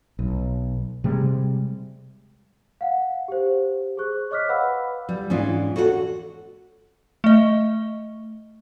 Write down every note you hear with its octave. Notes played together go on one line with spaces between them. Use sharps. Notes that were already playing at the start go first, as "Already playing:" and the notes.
B1
C3 G3 G#3
F5 F#5
G4 C5
G#4 C5 C#6 F#6
C#5 D#5 D6 F6 F#6 B6
B4 F5 F#5 B5 D6 E6
G3
G#2 E3 C#4 D4 F4
F#4 A4 C#5 E5 F#5
A3 D#5